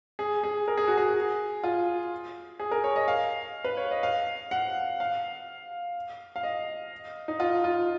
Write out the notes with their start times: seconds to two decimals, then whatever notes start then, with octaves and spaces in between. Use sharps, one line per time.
0.19 G#4
0.44 G#4
0.68 A#4
0.77 G#4
0.88 F#4
0.98 G#4
1.64 F4
2.60 G#4
2.71 A#4
2.84 C#5
2.96 D#5
3.08 F5
3.64 B4
3.77 C#5
3.91 D#5
4.03 F5
4.51 F#5
5.00 F5
6.36 F5
6.43 D#5
7.28 D#4
7.40 F4
7.64 F4